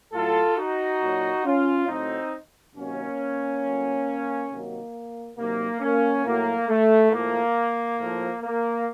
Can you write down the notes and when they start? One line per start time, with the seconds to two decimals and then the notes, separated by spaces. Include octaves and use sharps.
0.13 A2 F#3 F4 A4
0.57 D#4 F#4
1.02 A#2 F#3
1.45 C#4 F4
1.88 A2 F#3 C4 D#4
2.76 C3 D#3 F#3 A#3 C#4
3.62 A2 F#3
4.50 C3 D#3 F#3 A#3
5.37 C3 D#3 F#3 A#3
5.80 A#3 C#4
6.25 A2 F#3 A#3
6.68 A3
7.12 A2 F3 A#3
7.99 A2 F3
8.43 A#3